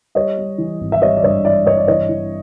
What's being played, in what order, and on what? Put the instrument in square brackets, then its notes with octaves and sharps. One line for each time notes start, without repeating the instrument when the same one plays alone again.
[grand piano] G3 C#5 D#5
G3
E3
G#1
E5
G3 C#5 D#5
D5
G2 C#5 D#5
E3 D5 E5
G2 C#5 D#5
D5
E3 C#5 D#5
E3